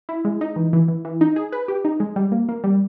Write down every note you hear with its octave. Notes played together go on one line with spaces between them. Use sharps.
E4
G#3
D#4
E3
E3
E3
E3
D#4
G#4
B4
G4
D#4
G#3
G3
A#3
A#3
G3